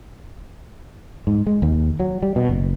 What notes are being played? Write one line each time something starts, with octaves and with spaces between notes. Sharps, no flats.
G#2
G#3
D#2
F#3
G3
B2
F#1